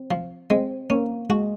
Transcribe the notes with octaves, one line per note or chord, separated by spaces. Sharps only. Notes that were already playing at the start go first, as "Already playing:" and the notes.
Already playing: C4
F3
G#3 C4
A#3 C#4
G#3 F#4